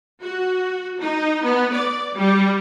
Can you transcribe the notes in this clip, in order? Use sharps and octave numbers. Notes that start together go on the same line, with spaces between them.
F#4
D#4
B3
D5
G3